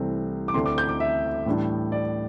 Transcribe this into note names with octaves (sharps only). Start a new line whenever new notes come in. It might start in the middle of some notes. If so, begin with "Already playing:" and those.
Already playing: C2 C3 E3 A3 C4
D6
D2 D3 A3 C4 E4 C6
D6
G6
D6
E5
A2 E3 G3 D4
D5